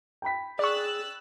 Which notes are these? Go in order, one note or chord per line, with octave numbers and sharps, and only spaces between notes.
G5 B5 B6
G#4 D5 C#6 E6 F#6 A6